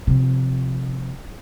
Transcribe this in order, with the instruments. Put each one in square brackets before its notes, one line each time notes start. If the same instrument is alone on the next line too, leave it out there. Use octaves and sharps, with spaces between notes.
[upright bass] C3 F3